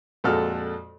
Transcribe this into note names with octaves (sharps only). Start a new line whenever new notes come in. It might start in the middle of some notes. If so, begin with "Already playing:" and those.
F2 A#2 G#3 F#4 A4 F6